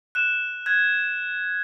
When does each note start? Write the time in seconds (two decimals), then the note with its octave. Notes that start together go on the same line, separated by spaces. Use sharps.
0.15 F#6 E7
0.66 F#6 G#6